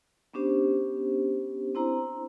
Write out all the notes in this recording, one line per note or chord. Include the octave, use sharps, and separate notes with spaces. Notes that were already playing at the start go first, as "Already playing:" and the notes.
B3 C#4 D4 G4 C5
C4 D4 E4 C5 A#5